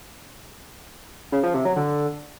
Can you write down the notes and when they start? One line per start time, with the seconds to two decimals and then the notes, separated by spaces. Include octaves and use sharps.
1.32 C#3
1.43 F3
1.54 C3
1.65 F#3
1.76 D3